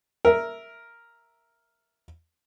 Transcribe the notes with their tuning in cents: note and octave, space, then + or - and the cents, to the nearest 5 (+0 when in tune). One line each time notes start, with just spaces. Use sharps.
A#4 +0 E5 +0